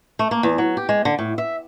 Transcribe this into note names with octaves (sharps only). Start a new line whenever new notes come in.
A3
A#3
E2
F#3
G4
G#3
D3
A2
E5